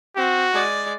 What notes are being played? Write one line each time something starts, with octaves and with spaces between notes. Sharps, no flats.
C4 F#4
G#3 D5